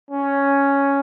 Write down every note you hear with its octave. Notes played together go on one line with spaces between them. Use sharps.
C#4